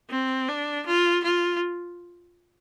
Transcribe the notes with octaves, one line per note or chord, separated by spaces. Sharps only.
C4
D4
F4
F4